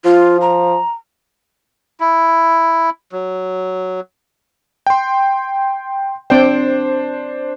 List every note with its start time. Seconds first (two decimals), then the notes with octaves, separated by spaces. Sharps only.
0.05 F3 F4
0.41 A#5
2.00 E4
3.12 F#3
4.87 G5 C6
6.30 C4 D4 C5 D5 G5